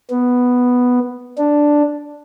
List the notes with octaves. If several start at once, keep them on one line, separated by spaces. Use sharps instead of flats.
B3
D4